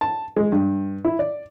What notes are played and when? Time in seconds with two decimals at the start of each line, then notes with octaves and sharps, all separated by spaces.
0.01 A5
0.36 G#3
0.52 G2
1.05 E4
1.19 D5